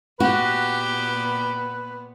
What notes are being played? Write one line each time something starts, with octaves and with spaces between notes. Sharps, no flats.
A#2 B3 F#4 G4 B4